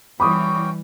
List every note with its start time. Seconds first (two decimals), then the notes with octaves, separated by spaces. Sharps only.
0.20 E3 G3 C#4 F#4 G5 B5 D6 D#6